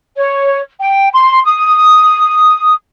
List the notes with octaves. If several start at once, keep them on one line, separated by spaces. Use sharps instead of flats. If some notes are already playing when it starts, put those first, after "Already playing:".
C#5
G5
C6
D#6